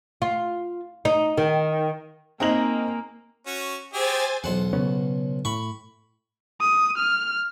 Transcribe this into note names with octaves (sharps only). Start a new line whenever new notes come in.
F4
D#4
D#3
A#3 C4 D#4 G#4 A#4 A#5 F#7
C#4 F#4
G4 G#4 C5 E5 G#5 A6
B1 E2 C5 F#5
C#3 B3 C#4
A2 B5 C#6
D#6
F6